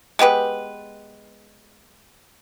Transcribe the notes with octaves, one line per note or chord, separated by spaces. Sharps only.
G#3 B3 G4 B4